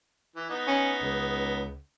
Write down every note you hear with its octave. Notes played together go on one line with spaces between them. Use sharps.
E3
B3 D#4
C#4
C#2